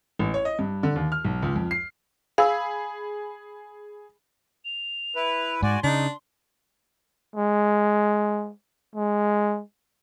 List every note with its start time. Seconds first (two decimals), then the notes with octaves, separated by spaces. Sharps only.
0.19 A1
0.34 C#5
0.45 D#5
0.59 G2
0.83 D3
0.96 D#2
1.12 F6
1.24 B1
1.43 C#2
1.56 F2
1.71 C7
2.38 G#4 F5 B5 E6
4.65 F7
5.15 E4 B4
5.62 G#2 F#4 D5 G#5 C6
5.84 C#3 D4 D#4
7.36 G#3
8.96 G#3